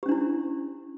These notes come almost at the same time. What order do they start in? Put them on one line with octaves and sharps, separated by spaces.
G4 C#4 D4 E4